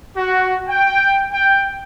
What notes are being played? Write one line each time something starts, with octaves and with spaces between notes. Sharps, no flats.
F#4
G5
G5